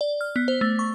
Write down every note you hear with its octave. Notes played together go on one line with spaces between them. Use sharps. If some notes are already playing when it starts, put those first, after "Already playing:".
D5
F6
B3
C5
A3
C#6